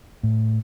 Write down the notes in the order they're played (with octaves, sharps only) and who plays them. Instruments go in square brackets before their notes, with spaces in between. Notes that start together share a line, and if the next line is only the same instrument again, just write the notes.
[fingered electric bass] A2